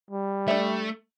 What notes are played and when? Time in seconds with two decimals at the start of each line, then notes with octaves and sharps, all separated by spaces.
0.11 G3
0.48 A3 D4 D5 E5